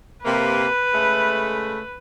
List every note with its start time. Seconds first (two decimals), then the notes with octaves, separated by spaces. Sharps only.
0.25 C3 A#3 B4
0.93 C#3 G#3 A3